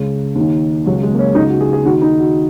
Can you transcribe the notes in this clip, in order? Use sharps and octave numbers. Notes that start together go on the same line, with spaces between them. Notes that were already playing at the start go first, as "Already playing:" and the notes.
Already playing: C#2 C#3
D#2 D#3
C#2 C#3 F#3
G#3
A#3
C#4
C#2 C#3 D#4
F#4
G#4
G#4
D#2 D#3 F#4
D#4
F#4